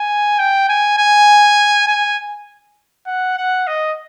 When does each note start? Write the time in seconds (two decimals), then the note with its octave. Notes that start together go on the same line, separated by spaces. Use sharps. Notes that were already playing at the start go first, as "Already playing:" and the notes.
Already playing: G#5
0.39 G5
0.69 G#5
0.98 G#5
1.88 G#5
3.06 F#5
3.37 F#5
3.67 D#5